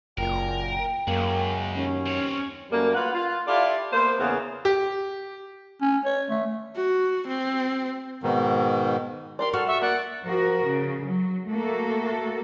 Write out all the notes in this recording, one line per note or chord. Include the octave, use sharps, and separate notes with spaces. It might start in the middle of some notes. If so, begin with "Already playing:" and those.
F#1 A#2 A#4 G5
G5
F#2 C#3 G#3 A#3
D#2 C#4
C4 C#5
F#2 G3 A3 A#3
F4 F#4 B4 F5 F#5
F4
E4 F4 G4 A4 D5
A#3 B3 C5
E2 C#3 A#3 B3
G4
C#4
C#5
A3
F#4
C4
G#2 B2 D#3
G4 A#4 D5 C6
F#4 A4 F6
E5 C#6
A#3 D5 F#5
F3 F#4 A#4
C#3
F#3
A3 A#3 F#4 A4